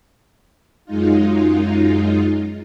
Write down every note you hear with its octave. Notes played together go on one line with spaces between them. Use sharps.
F#2 G#3 D#4 F4